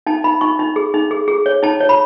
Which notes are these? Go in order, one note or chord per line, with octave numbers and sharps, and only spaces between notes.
D#4 A5
D#4 B5
D#4 C#6
D#4
G#4
D#4
G#4
G#4
C#5
D#4 A5
C#5
B5